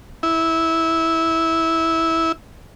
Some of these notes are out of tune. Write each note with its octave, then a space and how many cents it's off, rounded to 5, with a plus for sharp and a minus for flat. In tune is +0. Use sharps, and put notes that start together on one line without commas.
E4 -15